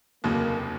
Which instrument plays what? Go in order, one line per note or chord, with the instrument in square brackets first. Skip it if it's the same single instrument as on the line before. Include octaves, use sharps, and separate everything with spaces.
[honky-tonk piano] F1 D#2 C#3 F#3 [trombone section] A#3